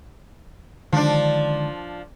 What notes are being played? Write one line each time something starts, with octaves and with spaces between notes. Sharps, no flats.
D3 D#3 F3 G#3 D4